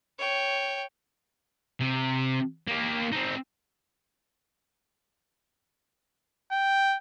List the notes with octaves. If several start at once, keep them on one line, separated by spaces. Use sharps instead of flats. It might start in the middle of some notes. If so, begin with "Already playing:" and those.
C#5 G5
C3
A#3 G4
C4 D#4
G5